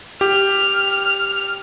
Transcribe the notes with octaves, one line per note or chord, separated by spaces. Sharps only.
G4 F6